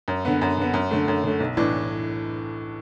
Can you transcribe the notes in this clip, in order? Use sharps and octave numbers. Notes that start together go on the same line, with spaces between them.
F#2
D3 B3
F#2
D3 B3
F#2
D3 A3
F#2
D3 A3
B1
A2 E3 D4